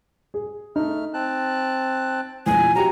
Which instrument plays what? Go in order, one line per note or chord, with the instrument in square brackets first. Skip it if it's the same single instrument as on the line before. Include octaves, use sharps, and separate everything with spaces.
[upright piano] G#4
[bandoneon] A3 F6 [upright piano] D#4
[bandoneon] C4 A5 F#6
[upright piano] A#1 E2 [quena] G#5
[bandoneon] C3 F#3 [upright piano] F#4 G4 [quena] A#5